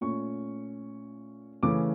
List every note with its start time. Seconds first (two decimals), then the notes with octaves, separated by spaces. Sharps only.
0.01 A#2 A3 C#4 C#6
1.63 C#3 E3 A3 C#4 D6